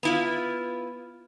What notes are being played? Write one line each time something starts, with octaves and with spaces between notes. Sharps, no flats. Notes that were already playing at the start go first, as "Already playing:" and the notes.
B3 E4 F4